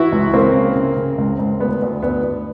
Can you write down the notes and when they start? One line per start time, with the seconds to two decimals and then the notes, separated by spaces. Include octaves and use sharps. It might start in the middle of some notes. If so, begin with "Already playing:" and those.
Already playing: E3 E4 F#4
0.12 C#2
0.34 C#2 A#3 C4
0.54 C#3
0.75 C#3
0.97 C#3
1.18 C#2
1.39 C#2
1.60 D2 B3
1.82 D2
2.03 D2 B3
2.23 D2